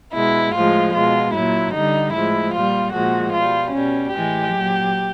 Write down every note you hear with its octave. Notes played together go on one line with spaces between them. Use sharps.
B2 G#3 E4
A2 F3 G#3 F4
B2 G#3 F4
A#2 F#3 E4
D3 G3 D#4
A2 F3 G#3 E4
A#2 G3 F4
A#2 F3 G#3 F#4
B2 G3 F4
B2 G3 C#4
A2 E3 G#3 G4
A#2 F#3